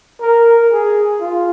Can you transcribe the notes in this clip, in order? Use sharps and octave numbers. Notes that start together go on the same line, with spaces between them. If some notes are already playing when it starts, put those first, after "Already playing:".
A#4
G#4
F4